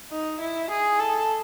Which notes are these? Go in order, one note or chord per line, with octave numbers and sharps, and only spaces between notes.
D#4
E4
G#4
A4